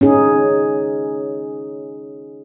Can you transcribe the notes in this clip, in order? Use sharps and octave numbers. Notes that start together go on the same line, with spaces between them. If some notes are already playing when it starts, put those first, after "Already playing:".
C#4 D#4 G#4